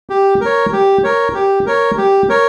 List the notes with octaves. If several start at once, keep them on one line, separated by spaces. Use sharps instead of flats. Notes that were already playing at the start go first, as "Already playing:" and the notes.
G4
A#4 C#5
G4
A#4 C#5
G4
A#4 C#5
G4
A#4 C#5